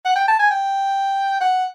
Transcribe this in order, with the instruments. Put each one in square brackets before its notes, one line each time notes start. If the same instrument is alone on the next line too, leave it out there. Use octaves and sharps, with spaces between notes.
[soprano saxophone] F#5
G5
A5
G#5
G5
F#5